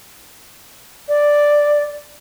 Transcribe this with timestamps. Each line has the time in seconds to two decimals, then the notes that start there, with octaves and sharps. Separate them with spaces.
1.09 D5